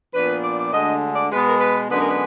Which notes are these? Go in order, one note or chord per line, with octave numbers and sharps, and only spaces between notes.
A#2 F3 B3 D4 B4
D5
D5
D2 D3 G#3 D#5
D5
B2 G#3 B3 B4
A#4
B4
F#2 D3 G#3 B3 D4 B4
A#4
B4